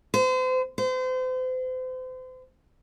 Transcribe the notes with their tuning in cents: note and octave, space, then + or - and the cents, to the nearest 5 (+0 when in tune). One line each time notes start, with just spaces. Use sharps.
C5 -35
C5 -35